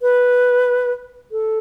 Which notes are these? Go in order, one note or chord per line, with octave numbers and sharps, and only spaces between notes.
B4
A4